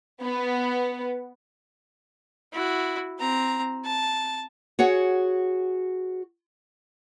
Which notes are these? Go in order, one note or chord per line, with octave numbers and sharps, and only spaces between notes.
B3
E4 F#4
C4 A#5
A5
F#4 G#4 C#5 F#5